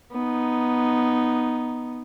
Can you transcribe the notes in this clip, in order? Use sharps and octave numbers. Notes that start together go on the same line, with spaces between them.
B3 D#4